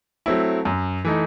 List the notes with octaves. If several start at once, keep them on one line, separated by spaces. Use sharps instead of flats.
F#3 A3 C4 E4
F#2
E3 A3 D#4